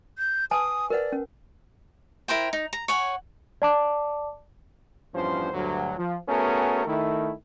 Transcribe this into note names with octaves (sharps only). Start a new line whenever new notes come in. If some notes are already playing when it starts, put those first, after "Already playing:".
G6
B4 G#5 A5 D#6
A#4 B4 D5 F#5
C#4
E4 A#4 C5 G5
D#4
A#5
C#5 F#5 G#5
D5 A5 D6
E2 G2 F3 C#4 C5
D2 G2 F#3
F3
A3 B3 C#4 F#4 G#4 A#4
D#3 A3 E4